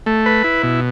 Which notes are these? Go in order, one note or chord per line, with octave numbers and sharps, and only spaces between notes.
A3
B4
E4
B2